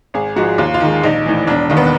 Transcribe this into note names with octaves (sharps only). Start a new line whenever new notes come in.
G#1 G#4
G#2 F3 G#3 F#4
D#2 F4
F4
D#3 G#3
A#1 D#4
A2 E3
E1 D4
D#2 D#3
B3